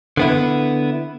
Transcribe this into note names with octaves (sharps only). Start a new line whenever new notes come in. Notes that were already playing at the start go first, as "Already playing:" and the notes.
D3 B3 E4